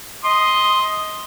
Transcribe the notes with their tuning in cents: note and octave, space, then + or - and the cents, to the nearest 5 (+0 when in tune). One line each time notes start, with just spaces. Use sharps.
D#5 +20 C6 +0 D#6 +0